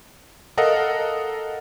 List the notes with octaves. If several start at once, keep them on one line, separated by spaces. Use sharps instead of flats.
A4 A#4 D#5 F5 F#5